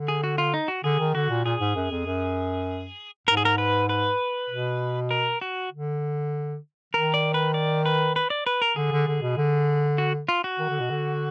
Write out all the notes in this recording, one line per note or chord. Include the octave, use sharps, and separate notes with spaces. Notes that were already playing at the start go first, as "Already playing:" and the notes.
Already playing: D3
G#4
F#4
F4
D#4
F#4
D3 G#4
D#3
D3 F#4
A#2
A#2 G#4
G#2
F#2
F2
F#2
G#2 A#4
G#4
A#4
B4
B4
B2
A#4
F#4
D3
D#3 A#4
D5
B4
D5
B4
B4
D5
B4
A#4
D3 G#4
D3
D3
B2
D3
F#4
F4
F#4
D#3
D3
B2
D3